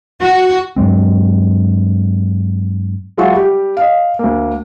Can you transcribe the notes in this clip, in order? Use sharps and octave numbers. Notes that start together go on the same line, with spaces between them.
F#4
G2 F#3 G#3 C4
F#3 G#3 F4 E5 F#5 C#6
G3 G4
D#5 F5
D2 A#3